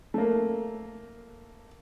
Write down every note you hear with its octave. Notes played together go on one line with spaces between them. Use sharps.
A3 A#3